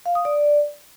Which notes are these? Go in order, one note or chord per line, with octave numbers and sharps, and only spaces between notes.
F5
D#6
D5